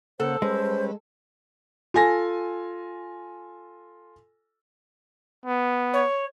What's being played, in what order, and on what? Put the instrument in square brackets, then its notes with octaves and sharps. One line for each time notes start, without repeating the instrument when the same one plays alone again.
[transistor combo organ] C#3 A#3 F#5 [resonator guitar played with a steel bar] A4 [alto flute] C5
[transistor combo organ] G3 C#4 B4 [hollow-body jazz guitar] G#3 [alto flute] C5
[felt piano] F4 A4 G#5 A#6
[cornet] B3
[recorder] C#5